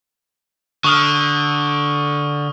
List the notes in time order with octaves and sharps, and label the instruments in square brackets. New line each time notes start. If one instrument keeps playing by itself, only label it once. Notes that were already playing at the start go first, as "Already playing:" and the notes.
[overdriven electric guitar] D3 [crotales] C#6 D#6 F6